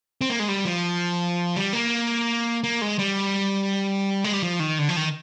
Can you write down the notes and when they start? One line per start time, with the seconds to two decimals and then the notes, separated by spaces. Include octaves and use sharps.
0.21 C4
0.30 A#3
0.40 G#3
0.48 G3
0.65 F3
1.56 G3
1.73 A#3
2.64 A#3
2.82 G#3
2.99 G3
4.24 G#3
4.33 G3
4.42 F3
4.60 D#3
4.79 D3
4.89 F3
4.96 D#3